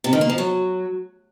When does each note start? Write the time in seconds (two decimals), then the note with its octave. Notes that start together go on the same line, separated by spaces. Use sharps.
0.04 C3
0.13 D#3
0.21 A#3
0.30 F3
0.38 F#3